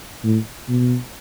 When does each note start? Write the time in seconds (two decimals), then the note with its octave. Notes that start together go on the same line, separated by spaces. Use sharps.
0.24 A2
0.69 B2